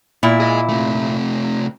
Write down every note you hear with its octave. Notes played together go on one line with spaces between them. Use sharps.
A#2 E4
G#4 D#5
C3 A3